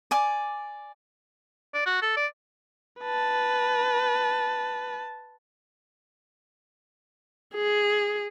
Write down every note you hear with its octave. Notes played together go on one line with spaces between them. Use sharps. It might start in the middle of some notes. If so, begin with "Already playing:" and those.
D5 G#5 D6
D5
F#4
A4
D5
B4 A5
G#4